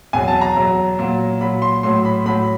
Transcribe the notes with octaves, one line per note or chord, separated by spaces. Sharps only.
E2 B2 F#3 G#5
A5
A#5
E2 B2 F#3
A#2 F#3
A#2 F#3 B5
C6
A2 F#3 C6
B5
A2 F#3 B5